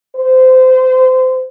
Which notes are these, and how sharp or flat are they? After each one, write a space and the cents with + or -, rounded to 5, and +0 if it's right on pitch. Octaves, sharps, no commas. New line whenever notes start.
C5 -25